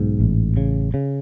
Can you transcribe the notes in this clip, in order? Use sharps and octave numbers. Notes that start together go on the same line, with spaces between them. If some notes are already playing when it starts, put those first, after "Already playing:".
Already playing: B1 G#2
A1
C#3
C#3